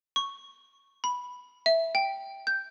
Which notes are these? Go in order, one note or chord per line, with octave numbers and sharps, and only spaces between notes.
C#6
B5
E5
G5
G6